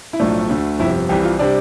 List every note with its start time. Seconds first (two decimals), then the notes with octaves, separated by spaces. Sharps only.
0.13 E4
0.20 B1 A2 F3 A3 D4
0.49 D2 D3 A3
0.79 G1 F2 C3 E4
1.09 C2 C3 E3 G3 G4
1.24 F4
1.39 C3 G3 D4